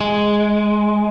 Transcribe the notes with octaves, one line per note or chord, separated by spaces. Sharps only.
G#3